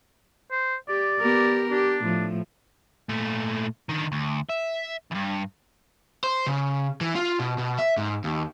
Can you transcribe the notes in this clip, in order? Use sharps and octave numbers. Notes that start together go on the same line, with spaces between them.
C5
G4 D5
B3 G4 A#4
D4 G4
A2 F3
A#2 A3
D3 D#3
D2
E5
E2 G2
C5
C#3
E3
F4
B2
B2
E5
G#2
D#2